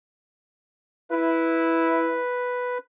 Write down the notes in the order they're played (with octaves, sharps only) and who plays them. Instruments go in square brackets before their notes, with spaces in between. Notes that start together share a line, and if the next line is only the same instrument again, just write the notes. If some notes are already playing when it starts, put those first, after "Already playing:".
[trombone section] E4 [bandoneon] B4